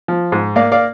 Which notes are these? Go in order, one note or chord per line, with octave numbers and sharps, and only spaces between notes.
F3
G#2
A#3 D5 F5
D5 F5